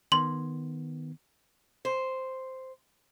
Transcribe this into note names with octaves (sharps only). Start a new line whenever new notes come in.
D#3 B3 C6 F#7
C5